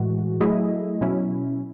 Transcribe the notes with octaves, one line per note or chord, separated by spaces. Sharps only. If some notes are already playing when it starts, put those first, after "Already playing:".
Already playing: A2 E3 G#3 F#4
F#3 A3 E4 G#4 D#5
B2 F#3 C#4 E4